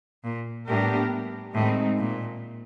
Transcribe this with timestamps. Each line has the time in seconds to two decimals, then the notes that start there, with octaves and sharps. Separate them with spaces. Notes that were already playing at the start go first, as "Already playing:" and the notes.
0.24 A#2
0.68 A2 G3 B3 D4 G4 A#4
1.53 A2 D#3 G#3 C4 D#4
1.97 A#2